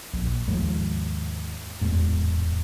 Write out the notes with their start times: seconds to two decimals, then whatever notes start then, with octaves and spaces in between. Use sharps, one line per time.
0.13 A#1
0.47 D#2 G#2 F3
1.81 D1 E2 G#2